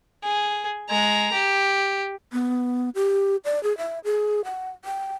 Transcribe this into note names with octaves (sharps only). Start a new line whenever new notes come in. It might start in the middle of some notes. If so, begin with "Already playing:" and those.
G#4
G#3 A#5
G4
B3
G4
D5
G#4
E5
G#4
F#5
G5